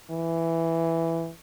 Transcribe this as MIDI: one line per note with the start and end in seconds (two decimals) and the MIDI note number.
0.11 1.30 52